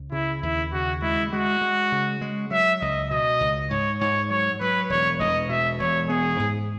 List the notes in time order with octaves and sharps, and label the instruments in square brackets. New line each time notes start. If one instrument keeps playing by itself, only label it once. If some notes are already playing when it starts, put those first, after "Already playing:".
Already playing: [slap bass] C#2
[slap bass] C#3 [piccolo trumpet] E4
[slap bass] D#2 [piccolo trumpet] E4
[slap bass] C#3 [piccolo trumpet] F#4
[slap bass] G#3 [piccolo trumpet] E4
[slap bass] G#3 [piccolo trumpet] F#4
[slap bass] G#3
C#3
G#3
[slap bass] F#3 [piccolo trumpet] E5
[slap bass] C#2 [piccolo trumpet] D#5
[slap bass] B2 [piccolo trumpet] D#5
[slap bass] C#2
[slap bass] G#2 [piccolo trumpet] C#5
[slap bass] G#2 [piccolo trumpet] C#5
[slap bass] F#3 [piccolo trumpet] C#5
[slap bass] F#3 [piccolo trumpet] B4
[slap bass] E1 [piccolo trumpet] C#5
[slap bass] E1 [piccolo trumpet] D#5
[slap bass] B2 [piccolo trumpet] E5
[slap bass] E1 [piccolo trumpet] C#5
[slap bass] B3 [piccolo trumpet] G#4
[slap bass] G#2